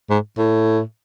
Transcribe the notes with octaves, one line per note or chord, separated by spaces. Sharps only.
G#2
A2